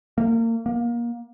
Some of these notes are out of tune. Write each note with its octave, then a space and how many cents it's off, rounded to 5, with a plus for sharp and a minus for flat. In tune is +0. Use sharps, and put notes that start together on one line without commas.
A#3 -30
A#3 +25